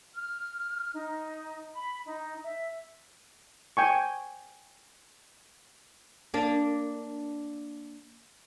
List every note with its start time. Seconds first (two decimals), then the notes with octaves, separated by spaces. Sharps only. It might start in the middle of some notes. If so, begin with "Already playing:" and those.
0.14 F6
0.93 D#4
1.73 B5
2.06 D#4
2.44 E5
3.77 G5 G#5 C#6
6.34 A#3 D4